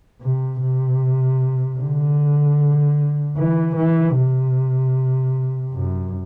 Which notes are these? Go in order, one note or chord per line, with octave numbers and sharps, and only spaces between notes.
C3
C3
D3
E3
E3
C3
F#2